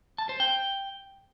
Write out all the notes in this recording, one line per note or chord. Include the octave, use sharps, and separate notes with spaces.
A5
C5
G5